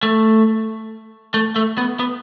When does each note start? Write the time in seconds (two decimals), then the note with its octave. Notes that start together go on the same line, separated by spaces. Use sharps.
0.03 A3
1.34 A3
1.56 A3
1.78 B3
2.00 B3